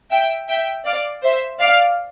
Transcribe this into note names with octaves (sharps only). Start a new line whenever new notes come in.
E5 G5
E5 G5
D5 F5
C5 E5
D5 F5